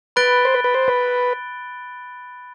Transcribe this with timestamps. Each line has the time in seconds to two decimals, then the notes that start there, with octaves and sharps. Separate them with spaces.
0.16 B4 B5 F#6 A6 D7 G7
0.45 C5
0.54 B4
0.64 B4
0.74 C5
0.88 B4